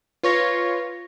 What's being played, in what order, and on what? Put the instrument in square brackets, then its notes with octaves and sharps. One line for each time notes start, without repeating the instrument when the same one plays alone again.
[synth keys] F4 C#5 [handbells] B4 C#6 A#6